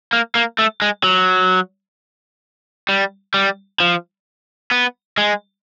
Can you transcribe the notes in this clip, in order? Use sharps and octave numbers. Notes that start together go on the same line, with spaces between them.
A#3
A#3
A3
G#3
F#3
G3
G3
F3
B3
G#3